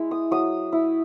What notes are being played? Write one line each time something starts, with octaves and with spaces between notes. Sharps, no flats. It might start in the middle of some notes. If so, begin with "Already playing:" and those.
Already playing: G#3 E4
D#6
F#3 D#6
E4